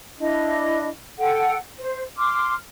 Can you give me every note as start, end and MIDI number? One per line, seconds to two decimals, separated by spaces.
0.19 0.88 62
0.19 0.88 64
0.19 0.88 75
1.18 1.55 69
1.18 1.55 78
1.18 1.55 79
1.79 2.02 72
2.17 2.53 84
2.17 2.53 86
2.17 2.53 89